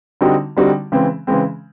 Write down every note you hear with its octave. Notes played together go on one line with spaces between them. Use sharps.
D3 G3 C4 D#4 F#4
D3 G3 C4 D#4 F#4
C#3 E3 G#3 C4
C#3 E3 G#3 C4